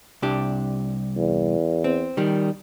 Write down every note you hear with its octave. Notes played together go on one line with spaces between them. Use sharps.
C2 D4 G4
E2
C4
D#3 G3